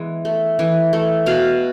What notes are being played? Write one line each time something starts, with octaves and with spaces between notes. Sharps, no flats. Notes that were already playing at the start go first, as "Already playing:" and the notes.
Already playing: E3 G#3 B3
A3
E3
A3
B2 F5